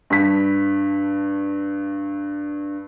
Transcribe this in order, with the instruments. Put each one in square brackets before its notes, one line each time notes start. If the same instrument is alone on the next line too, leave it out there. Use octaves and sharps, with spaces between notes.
[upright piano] G2 B6